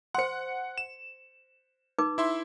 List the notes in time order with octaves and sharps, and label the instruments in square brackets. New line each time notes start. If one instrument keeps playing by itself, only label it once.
[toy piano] C5 C6 [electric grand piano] F#5 C#7
[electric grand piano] E7
[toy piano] D#4 B4 D6
[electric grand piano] E4 E5 C6